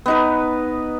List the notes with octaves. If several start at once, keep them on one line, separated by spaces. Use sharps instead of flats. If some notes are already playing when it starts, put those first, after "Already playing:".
B3 D#4 B4